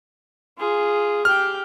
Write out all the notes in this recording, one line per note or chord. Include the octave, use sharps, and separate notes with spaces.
F4 G#4
G4 G5 F6